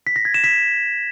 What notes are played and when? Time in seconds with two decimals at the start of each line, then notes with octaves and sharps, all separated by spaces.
0.07 B6
0.16 A#6
0.25 G#6
0.34 E7
0.44 B6